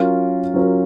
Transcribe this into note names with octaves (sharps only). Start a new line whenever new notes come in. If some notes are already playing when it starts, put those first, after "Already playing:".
Already playing: F#3 C#4 F4 A#4
F#3 C#4 F4 A#4